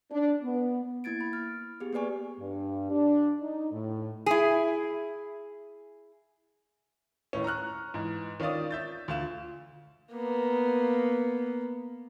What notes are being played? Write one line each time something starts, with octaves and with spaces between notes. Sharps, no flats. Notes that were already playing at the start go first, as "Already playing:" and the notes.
D4
B3
A#3 E4 G#6 A6 D7
B5
F6
B3 G4 G#4
A#3 G4 B4 D5 G#5 C#6
G2
D4
D#4
A2
E4 G#4
D#2 A2 C#4
A#5 C#6 F6 F#6
G#2 E3
D#3 C#4 F4 D5 D#6
E5 G6 A6
D2 F4 E7
A#3 B3